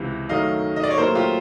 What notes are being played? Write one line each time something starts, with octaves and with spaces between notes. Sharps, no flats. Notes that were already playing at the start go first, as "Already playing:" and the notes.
Already playing: C#2 C3 E3
F#2 D#3 F#3 A3 D#5 F5
D#5
D5
C#5
A#2 F#3 A3 A#4 C5
F4 G4